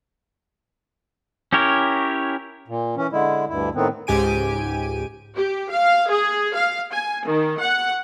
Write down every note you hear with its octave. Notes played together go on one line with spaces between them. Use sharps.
C#4 E4 G4 A#4 C#5
A#2
E3 C#4
D3 G#3 E4
D2 G2 E4
A2 D#3 B3 C4
C#2 G#2 G4 G#5 D7 D#7
G4
F5
G#4
F5
G#5
D#3
F#5